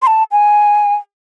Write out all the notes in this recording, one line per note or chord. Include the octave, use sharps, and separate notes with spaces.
C6
A5
G#5